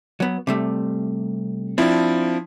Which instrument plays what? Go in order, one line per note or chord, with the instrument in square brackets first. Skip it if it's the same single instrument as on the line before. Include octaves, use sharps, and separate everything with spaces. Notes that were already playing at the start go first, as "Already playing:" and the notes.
[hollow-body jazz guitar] F#3 B3
C3 G3 A3
[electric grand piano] F3 E4 [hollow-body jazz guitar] C4 D4